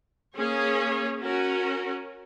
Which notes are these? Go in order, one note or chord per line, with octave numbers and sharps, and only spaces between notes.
A#3 C#4 G#4 C#5
C#4 F#4 A#4